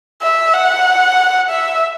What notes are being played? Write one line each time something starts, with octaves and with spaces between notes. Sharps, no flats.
E5
F#5
E5